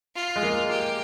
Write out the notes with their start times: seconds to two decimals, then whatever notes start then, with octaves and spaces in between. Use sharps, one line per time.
0.15 F4
0.36 G#3
0.43 A#3
0.70 G4